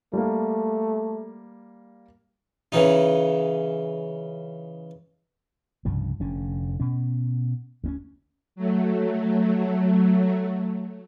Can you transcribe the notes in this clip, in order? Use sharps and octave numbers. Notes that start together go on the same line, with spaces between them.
G3 A3 A#3
C#3 E3 D#4
C2 G2 C#3 F3
F1 D3 C#4
B2 C#4
D2 C4 C#4
F#3 A3